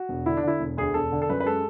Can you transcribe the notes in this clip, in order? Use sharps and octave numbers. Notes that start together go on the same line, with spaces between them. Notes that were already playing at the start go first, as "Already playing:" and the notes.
Already playing: F#4
E1
D3 E4
D4
D3 E4
E1
D2 G#4
E1 A4
D3
A4
F#2 B4
B4
G#3 A4